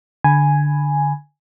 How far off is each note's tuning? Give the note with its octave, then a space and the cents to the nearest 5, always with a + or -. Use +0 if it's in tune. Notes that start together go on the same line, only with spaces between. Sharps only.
D3 +0 G#5 +0 B5 +0